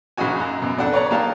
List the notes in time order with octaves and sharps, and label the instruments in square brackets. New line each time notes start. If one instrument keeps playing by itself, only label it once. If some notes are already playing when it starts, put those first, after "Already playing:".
[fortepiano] A#1 C#3 D#4 F#4 G#5
F#2
F#2 B2
F2 D4 A4 F#5
B4 C#5 D5 A#5
A#3 D#4 G4 F5 A5